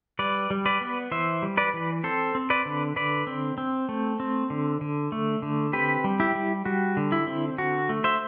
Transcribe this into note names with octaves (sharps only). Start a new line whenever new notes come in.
G3 B4 D5
G3
B4 D5
B3
E3 C5 E5
G3
B4 D5
E3
C4 A4 C5
C4
B4 D5
D3
D3 B4 D5
C4
C4
A3
C4
D3
D3
A3
D3
C4 G4 B4
G3
E4 G4
G3
G3 F#4
D3
E4
C4
D3 F#4
A3
C5 E5